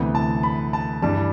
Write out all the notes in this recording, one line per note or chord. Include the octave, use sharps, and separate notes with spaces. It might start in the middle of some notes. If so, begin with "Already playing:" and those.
Already playing: D2 C3 E3 B3
A5
B5
A5
G2 E3 G3 A5